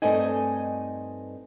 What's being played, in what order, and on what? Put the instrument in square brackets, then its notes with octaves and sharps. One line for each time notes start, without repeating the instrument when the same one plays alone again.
[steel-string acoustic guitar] G2 A3 C4 D#4 D#5 G#5